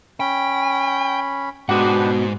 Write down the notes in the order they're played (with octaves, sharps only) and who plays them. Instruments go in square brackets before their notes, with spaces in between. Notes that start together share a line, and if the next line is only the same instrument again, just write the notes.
[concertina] C#4 B5 [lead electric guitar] G5
[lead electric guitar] G#2 [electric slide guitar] B2 F#4 F#5 [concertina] B3 D4 G4